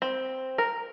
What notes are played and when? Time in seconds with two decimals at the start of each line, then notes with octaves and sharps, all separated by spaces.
0.02 C4
0.58 A#4